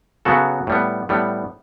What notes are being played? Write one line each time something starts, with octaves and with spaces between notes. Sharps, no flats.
C#3 F#3 B3 F#4 A4
A2 G3 B3
A2 G3 B3